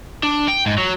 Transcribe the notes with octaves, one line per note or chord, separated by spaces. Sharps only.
D4
G5
G#2
F#3